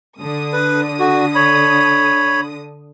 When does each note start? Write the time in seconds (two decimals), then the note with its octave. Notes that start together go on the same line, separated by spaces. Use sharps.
0.20 D3 D#6
0.53 B4
0.99 F#4
1.35 C#5 B5